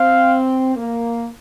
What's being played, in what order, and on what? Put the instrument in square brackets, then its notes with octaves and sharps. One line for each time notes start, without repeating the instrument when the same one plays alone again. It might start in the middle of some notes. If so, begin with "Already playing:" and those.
Already playing: [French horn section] C4 [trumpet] F5
[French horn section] A#3